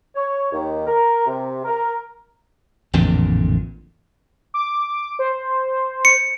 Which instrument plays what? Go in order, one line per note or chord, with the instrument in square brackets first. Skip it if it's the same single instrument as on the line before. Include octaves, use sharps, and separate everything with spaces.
[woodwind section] C#5
D#2
A#4
C3
A#4
[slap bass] A1 F2 A#2 D3
[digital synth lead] D6
C5
[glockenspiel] C#7